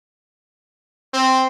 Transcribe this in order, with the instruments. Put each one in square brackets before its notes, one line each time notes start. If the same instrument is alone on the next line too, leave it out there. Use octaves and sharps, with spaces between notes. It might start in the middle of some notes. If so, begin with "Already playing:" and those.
[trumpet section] C4